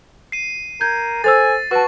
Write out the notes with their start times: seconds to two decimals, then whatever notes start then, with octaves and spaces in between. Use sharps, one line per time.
0.32 C7 D#7
0.81 A#4 G6 G#6
1.24 A4 C5 G#5 E6 A6
1.71 F#4 B4 A5 C#6